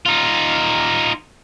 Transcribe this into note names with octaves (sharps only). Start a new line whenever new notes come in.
D#4 F4